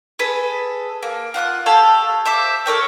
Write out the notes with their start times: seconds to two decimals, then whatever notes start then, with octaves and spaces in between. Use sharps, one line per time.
0.19 G#4 A4 B4
1.03 A#3
1.34 F4 F#5 D#6 F#6
1.66 G4 A4 C#5 F5
2.26 C5 E5 D6
2.66 A4 A#4 C#5 G5